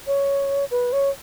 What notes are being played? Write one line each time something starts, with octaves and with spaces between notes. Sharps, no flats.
C#5
B4
C#5